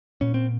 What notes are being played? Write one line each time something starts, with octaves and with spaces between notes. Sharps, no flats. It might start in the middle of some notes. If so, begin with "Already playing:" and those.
A#2 C#4
C4